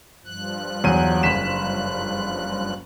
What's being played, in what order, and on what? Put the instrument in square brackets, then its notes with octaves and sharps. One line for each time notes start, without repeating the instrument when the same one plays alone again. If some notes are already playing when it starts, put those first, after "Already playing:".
[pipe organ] G2 F3 F#6
[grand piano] E2 F#3 D#7
F#1 B6 E7